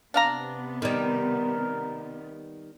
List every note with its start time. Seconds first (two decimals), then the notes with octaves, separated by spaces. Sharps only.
0.14 C3 B3 D4 F5 A#5
0.82 D#3 G3 A#4